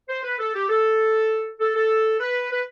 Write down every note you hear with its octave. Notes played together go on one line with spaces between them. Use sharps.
C5
B4
A4
G4
A4
A4
A4
B4
B4